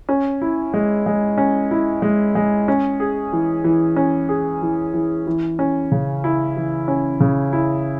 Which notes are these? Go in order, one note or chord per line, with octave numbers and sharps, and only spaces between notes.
C#4
E4
G#3
G#3
C#4
E4
G#3
G#3
C#4
G#4
E3
E3
C#4
G#4
E3
E3
E3
C#4
C#3
E4
E3
C#4
C#3
E4